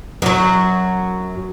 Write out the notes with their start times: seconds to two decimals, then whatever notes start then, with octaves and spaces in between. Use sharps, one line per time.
0.22 F#2 F#3